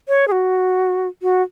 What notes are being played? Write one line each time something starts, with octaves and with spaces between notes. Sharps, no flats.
C#5
G#4
F#4
F#4